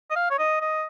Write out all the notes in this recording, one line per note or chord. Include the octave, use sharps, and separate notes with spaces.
D#5
F5
C#5
D#5
D#5